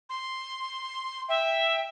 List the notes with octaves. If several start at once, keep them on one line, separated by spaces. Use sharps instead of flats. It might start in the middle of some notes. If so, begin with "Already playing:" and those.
C6
E5 G5